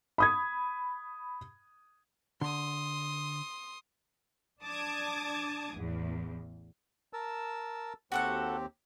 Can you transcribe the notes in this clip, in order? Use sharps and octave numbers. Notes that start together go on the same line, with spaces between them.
B5 D#6 G#6
D3 C6 D#6
D4 A5 D6 D#6 G#6
A1 E2
A#4 A5 E6
D#2 C4 F#4 G4 A4 F#5